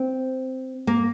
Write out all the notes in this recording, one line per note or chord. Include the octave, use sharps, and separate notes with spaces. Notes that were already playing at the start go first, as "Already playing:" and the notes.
Already playing: C4
A#3